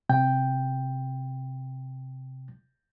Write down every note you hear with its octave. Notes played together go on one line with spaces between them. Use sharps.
C3 G5